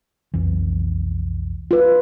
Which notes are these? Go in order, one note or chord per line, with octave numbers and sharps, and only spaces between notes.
B1 F2 E3
F4 B4